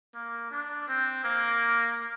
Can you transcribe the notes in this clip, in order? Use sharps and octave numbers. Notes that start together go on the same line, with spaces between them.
A#3
D4
C4
A#3